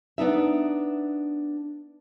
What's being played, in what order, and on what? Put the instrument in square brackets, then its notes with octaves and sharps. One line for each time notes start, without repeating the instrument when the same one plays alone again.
[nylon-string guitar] B3 D4 D#4 E5